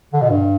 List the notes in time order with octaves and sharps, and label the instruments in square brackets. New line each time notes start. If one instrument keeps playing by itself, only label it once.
[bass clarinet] D3
B2
G2